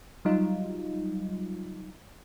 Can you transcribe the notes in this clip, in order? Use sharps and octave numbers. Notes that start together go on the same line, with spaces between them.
F#3 G3 D#4 F4